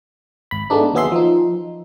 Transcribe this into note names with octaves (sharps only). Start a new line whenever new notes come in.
G#1 B5
G#3 A3 B3 D4 D#4
D#2 F#3 B3 G#4 E5 C6
F3 D#4